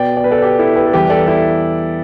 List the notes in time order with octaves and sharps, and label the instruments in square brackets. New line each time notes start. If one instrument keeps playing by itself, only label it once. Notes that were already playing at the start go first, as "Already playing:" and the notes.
Already playing: [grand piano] B2 B3 D5 G5
D5
B4
A4 D5
G4
E4 A4
G4 B4
A4
E2 E3 G3 G4 B4
A4 D5
E4 A4